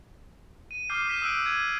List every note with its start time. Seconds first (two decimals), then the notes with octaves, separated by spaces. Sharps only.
0.71 D#7
0.89 D6 D#6 F6 G6 C7 D#7
1.08 F6 G6 B6 D#7 E7
1.22 D#6 E6 F#6 G6 D7
1.43 G#6 D#7